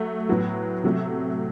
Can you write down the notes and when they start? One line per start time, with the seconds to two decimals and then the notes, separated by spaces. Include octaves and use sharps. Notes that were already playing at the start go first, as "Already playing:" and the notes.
Already playing: F#3 A3
0.29 A2 F#3 B3
0.84 C3 F#3 A3